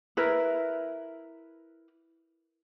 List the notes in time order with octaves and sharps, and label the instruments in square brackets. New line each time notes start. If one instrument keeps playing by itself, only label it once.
[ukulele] E4 A#4 B4